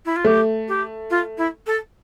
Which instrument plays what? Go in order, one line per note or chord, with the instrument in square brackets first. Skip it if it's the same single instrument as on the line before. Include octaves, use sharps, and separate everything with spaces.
[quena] E4
F4
[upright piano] A3 [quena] G4
[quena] G4
F4
E4
A4